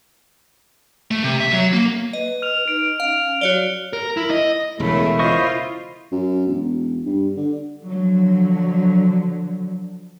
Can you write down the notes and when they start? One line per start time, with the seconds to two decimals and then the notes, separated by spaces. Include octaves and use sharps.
1.11 A3
1.24 C3
1.40 E5
1.53 F#3
1.73 A#3
2.13 B4 D#5
2.42 F6 F7
2.68 D#4 D7
3.00 C#4 F5
3.41 F#3 F#4 C#5 D5 G7
3.93 A#4
4.17 E4
4.31 D#5
4.80 E1 C#3 A3 E4 A#4
5.19 F4 C5 D#5 C#6
6.12 F#2
6.47 E1
7.06 G2
7.36 D3
7.85 D3 F3 F#3